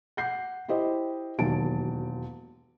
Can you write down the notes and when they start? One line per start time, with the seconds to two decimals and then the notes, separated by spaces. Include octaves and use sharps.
0.17 F#5 G6 C7
0.68 E4 G4 C5 D#5
1.39 E1 D#2 F#3 A5 D7